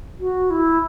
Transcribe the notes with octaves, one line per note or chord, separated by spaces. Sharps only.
F#4
E4